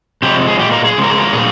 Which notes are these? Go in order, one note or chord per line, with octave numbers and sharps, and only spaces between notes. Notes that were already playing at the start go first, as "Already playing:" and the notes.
C3 F3 G#3 G4
G#4
A#2 G#3 G4
A#4
G#4
C#3 F3 G#3
A#4
G#4
A#4
A#2 G3 G#4